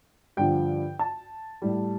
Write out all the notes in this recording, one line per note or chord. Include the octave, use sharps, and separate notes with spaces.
G2 D3 F3 G5
A5
A2 G3